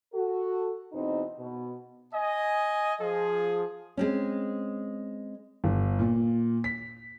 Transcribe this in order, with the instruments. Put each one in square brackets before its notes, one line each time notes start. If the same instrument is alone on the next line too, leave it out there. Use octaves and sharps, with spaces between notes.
[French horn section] F#4 A4
E2 B2 C4 D#4
B2
[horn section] D#5 G#5
F3 G#4
[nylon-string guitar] G#3 C4 C#4
[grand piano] G1
A#2
B6